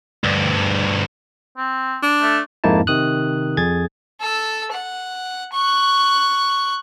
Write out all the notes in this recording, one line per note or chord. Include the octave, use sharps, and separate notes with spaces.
D2 G2
C4
D4
A3
F2 G#2 A#3 D#4 E4 A5
C3 D#3 D#6 F#6
F2 G#4 G#6 A6
A4 E6
F#5
C#6 F#6